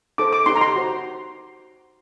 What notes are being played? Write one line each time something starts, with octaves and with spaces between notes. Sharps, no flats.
D#4 A4 C5 D6
D6
D#4 G4 C5 C6
A#5
C6
F#4 C5